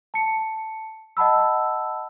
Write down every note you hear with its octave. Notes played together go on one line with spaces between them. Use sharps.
A5 C#7
D#5 F#5 A5 B5 E6